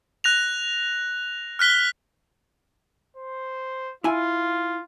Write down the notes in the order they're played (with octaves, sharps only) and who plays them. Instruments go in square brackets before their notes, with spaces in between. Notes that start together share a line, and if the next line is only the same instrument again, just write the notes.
[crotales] F#6 A#6 F7
F6 F#6 B6 G7
[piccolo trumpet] C5
[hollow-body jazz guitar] E4 G#5 [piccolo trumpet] F4